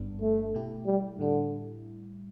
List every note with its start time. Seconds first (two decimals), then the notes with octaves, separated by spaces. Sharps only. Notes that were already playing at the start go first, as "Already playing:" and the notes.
Already playing: G1 G2 G3 B3 D4
0.21 A3
0.54 B2 A3 E4 G4
0.86 G3
1.19 A2 D3 G3 E4